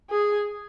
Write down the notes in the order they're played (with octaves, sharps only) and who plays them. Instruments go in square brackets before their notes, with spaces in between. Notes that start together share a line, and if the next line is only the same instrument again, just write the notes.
[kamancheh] G#4